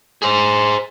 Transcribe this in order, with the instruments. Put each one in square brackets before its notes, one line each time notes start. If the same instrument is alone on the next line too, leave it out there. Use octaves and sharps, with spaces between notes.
[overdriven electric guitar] G#4 C5